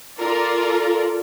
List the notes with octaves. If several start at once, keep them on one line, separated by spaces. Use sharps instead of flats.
F4 A4 A#4 D5